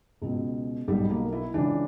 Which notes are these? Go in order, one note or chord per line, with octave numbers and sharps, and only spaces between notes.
C#2 B2
B1 G3
B2
A#3
E4
C#2 C#3 E3 D4